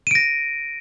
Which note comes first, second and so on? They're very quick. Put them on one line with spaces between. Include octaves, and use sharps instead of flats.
D#7 D7 A#6